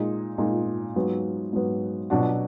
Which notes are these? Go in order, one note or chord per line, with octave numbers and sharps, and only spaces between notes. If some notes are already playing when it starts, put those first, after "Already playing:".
Already playing: A#2 G#3 D#4
A#2 G#3 D#4
G#2 F#3 B3
G#2 F#3 B3
B2 F#3 D4 F#4